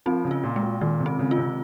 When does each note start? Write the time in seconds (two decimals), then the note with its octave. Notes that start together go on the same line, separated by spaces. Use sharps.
0.06 F3 C4
0.25 C#3
0.31 F4
0.43 A#2
0.56 G#3
0.63 A#2
0.81 A#2 D#3
1.00 C3
1.06 C4
1.19 C#3
1.31 F4
1.38 C3